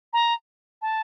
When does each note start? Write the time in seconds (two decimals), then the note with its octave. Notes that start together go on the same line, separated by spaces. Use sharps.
0.13 A#5
0.82 A5